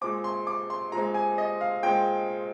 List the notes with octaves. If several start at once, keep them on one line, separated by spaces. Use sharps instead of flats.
A#2 G#3 C4 D6
C6
D6
C6
A#2 G#3 C4 A#5
G#5
D#5
F5
A#2 G#3 C4 G5